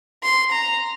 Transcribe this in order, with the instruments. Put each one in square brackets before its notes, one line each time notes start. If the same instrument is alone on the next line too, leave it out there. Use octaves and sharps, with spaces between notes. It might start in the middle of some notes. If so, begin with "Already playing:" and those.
[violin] C6
A#5